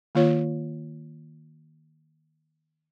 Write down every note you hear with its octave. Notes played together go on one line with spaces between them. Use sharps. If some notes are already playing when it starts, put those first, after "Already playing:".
D#3 A#3 F4 C#5